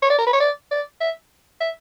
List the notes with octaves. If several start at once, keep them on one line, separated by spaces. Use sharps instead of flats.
C#5
D5
A#4
B4
C#5
D5
D5
E5
E5